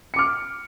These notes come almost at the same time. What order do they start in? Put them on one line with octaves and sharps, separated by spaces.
C#7 D6 F6